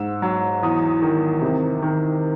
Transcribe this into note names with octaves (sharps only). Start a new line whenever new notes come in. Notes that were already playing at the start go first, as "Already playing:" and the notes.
Already playing: G#2 E6
F#3
E2 D#6
D#3
C3
D#3